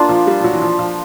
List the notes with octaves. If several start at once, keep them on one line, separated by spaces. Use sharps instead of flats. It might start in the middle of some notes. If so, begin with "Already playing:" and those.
Already playing: A#3 D4 F4
F3
G3
F3
F#3
E3
F3
F3